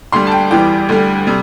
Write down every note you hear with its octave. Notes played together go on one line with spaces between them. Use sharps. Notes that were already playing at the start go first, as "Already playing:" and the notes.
D2 D3 G3 C6
A5
G5
E2 E3 G3 G5
D2 D3 G3
C3 G3